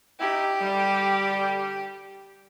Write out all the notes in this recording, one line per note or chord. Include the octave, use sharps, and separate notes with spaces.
D#4 E4 G4
D3 G3